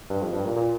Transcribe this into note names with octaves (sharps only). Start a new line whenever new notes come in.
G2
F2
G2
A#2
A#2